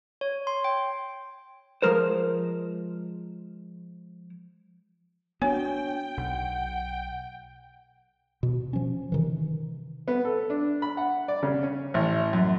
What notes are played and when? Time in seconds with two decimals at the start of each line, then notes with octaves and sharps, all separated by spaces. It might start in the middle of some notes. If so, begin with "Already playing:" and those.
0.21 C#5
0.47 C6
0.64 G5
1.82 F3 G#3 A#4 C5
5.42 B3 D4 F#4 C#5 G5 G#5
6.17 B1 F#5
8.43 B2
8.73 F3 C#4
9.12 C3 D#3 E3
10.08 B3
10.25 A4
10.50 D4
10.82 B5
10.97 F#5
11.28 D5
11.43 C#3
11.63 C#4
11.94 A1
12.33 F#2